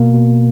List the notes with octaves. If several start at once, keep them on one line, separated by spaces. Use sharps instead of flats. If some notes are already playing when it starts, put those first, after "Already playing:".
Already playing: B2 A#3
B2